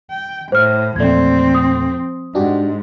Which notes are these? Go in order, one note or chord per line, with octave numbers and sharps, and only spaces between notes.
G5
A2 C5 F6
E2 A#2 F3 A3 C4 D5 G#6
D#6
G#2 D4 F#4 G4